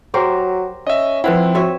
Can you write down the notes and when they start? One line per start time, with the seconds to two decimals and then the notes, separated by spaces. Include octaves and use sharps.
0.14 F#3 G4 G#4 A#4 C5
0.87 C#4 D#5 E5
1.24 F3 C4 E4 B4 C5 F#5
1.55 F#4 B4 C#5 E5